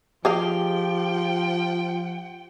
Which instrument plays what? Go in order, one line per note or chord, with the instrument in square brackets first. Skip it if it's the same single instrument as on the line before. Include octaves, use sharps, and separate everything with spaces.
[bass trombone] F3 [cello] F4 G5 [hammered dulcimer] G4 [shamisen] G#4 D#5 F5